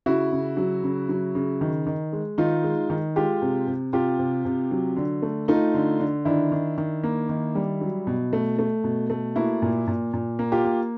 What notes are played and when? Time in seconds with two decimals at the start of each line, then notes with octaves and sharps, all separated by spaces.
0.06 C#3 E4 F#4
0.32 C#3
0.57 F#3
0.83 C#3
1.09 F#3
1.35 C#3
1.61 D#3
1.87 D#3
2.13 G#3
2.38 D#3 D#4 F4
2.64 G#3
2.90 D#3
3.16 G#3 F4 G4
3.42 C3
3.67 C3
3.93 C3 F4 G4
4.19 C3
4.45 C3
4.71 F#3
4.96 D3
5.22 A3
5.48 A3 D#4 F4
5.74 D3
6.00 D3
6.25 D#3 D4 E4
6.52 D#3
6.78 D#3
7.03 A#3
7.29 D#3
7.55 G3
7.81 F#3
8.07 B2
8.33 A3
8.59 A3
8.84 B2
9.10 A3
9.36 A#3 E4 F#4
9.62 A#2
9.87 A#2
10.14 A#2
10.39 A#3
10.52 F4 G4
10.65 A#3